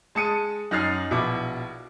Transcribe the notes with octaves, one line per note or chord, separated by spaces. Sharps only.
G#3 A5 D#6 C#7 D#7
F#2 D#4 G#5 F6 A6 C7
A#1 B2 E4 D6